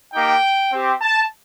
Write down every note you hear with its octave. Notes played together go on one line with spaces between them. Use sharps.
A#3 D#4 G4 G5
C4 G4
A5